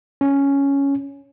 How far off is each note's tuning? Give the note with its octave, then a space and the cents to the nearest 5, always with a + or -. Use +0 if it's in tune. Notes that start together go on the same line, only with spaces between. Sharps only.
C#4 +5